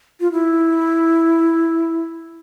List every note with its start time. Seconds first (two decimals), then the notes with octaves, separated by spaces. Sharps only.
0.20 F4
0.32 E4